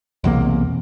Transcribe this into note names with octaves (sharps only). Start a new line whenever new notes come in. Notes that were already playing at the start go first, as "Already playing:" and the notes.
B1 E2 C3 A#3